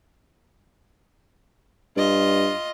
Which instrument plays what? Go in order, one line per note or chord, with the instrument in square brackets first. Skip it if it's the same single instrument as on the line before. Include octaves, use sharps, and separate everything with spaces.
[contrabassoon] G2 [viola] F4 D#5